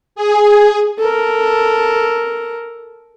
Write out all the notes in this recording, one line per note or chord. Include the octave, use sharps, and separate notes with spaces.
G#4
A4 A#4